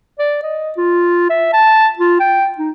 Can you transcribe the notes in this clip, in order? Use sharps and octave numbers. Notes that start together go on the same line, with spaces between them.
D5
D#5
F4
E5
A5
F4
G5
D#4